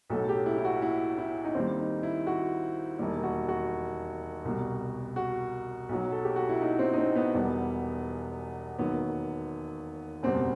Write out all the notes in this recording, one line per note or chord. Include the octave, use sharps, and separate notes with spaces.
B1 A2 F#3 A4
G4
E4
E4
F#4
E4
E4
D#4
D#2 D#3 G3 C4
D#4
E4
F#4
E1 D#2 D#3 G3
F#4
F#4
C2 B2 G3
F#4
B1 B2 F#3
A4
G4
F#4
E4
D#4
C4
D#4
C4
B3
E1 E2 B2 G3
E1 D#2 D#3 F#3 B3
F#1 E2 B2 G3 C4